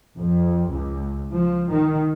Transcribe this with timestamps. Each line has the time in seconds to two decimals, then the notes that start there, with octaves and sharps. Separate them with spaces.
0.17 F2
0.71 C#2
1.31 F3
1.70 D#3